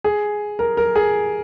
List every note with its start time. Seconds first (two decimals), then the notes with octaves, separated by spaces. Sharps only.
0.04 G#4
0.59 A#4
0.77 A#4
0.95 G#4